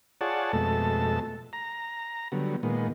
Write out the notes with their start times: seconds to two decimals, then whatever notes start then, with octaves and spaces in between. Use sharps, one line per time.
0.21 F4 G#4 C#5 D5 F#5 A5
0.53 F2 B2 G#3 A3 A4 A5
1.53 A#5
2.32 D3 F#3 G3 B3
2.63 A#2 D#3 G#3 B3